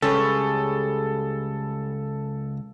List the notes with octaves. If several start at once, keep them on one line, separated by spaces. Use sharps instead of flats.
C#2 G3 C#4 G#4 A4 B4 C#5